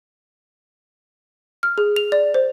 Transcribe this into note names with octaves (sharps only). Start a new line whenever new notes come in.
F6
G#4
F7
D5
C5